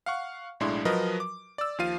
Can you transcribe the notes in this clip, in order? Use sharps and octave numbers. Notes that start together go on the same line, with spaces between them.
F5 F#5 C#6
B1 A2 G#3 D4 E4 C6
F3 F#3 A#4 B4 D#5
D6
D5 E6
D#2 F3 F4 F5 D#7